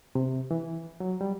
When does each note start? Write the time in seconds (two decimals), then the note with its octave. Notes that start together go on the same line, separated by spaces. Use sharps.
0.15 C3
0.51 E3
1.00 F#3
1.21 G3